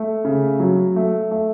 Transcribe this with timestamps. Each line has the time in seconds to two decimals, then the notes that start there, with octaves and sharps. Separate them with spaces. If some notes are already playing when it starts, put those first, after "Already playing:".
Already playing: A3
0.25 C#3
0.60 F#3
0.96 A3
1.31 A3